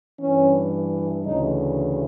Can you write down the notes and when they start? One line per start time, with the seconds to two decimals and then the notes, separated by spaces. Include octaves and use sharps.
0.20 G2 E3 C#4
1.25 D2 C#3 E3 D#4